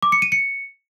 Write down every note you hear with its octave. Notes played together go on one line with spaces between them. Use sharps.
D6
C#7
D#7
C#7